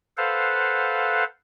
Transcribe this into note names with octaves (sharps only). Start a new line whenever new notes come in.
A4 B4 C5 F5 F#5